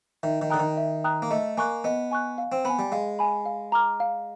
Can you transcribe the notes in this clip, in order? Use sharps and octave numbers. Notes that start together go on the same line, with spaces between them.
D#3 E5
D#3
D3 G5 A#5 D#6 F#6
D#3
E5
G5 A#5 D#6 F#6
A#3
A3 D#5
A#3 G#5 C#6 F#6
B3 D#5
G#5 C#6 F#6
F5
C4
B3 G#5 B5
G3
G#3 F5
G#5 B5
F5
A#5 D6 F6
F5